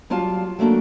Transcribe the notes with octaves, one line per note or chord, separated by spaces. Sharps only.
F#3 G3 F4 F5 A5
F#3 A3 A#3 D4 A#4